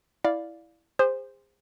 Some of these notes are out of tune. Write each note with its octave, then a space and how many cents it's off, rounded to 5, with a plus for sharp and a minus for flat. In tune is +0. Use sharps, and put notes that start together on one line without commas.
E4 +0 D5 +0 F5 +10
G#4 -40 C5 +0